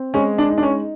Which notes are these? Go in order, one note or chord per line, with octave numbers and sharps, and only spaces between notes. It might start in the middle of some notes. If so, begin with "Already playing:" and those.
Already playing: C4
G#3 C#4
D4
D#4
D4
C#4